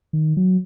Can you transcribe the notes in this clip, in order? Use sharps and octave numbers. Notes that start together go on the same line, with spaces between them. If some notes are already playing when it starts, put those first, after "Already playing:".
D#3
F#3